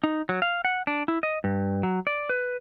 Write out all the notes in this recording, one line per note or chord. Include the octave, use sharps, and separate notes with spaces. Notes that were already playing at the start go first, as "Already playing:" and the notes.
D#4
F#3
F5
F#5
D4
E4
D#5
G2
F#3
D5
B4